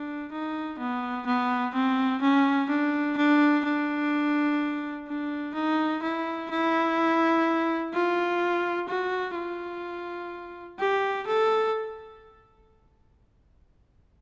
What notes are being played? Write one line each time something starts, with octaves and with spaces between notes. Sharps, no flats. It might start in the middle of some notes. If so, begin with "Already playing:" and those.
Already playing: D4
D#4
B3
B3
C4
C#4
D4
D4
D4
D4
D#4
E4
E4
F4
F#4
F4
G4
A4